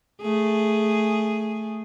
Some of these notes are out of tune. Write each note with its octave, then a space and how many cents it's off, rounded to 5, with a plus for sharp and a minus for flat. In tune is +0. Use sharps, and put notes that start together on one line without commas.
A3 +0 G#4 +0